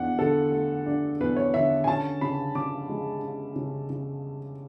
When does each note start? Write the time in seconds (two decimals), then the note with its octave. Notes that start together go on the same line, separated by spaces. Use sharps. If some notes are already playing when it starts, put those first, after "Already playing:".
Already playing: E2 D4 F#5
0.19 D3 A4
0.52 A3
0.86 D4
1.20 E2 B4
1.36 C#5
1.54 D3 E5
1.84 G#5
1.87 C#4 A5
2.21 C#3 B5
2.55 C#3 D6
2.89 G#3
3.22 C#4
3.56 C#3
3.90 C#3